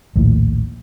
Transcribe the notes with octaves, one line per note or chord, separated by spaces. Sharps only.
A#1 D#2 A2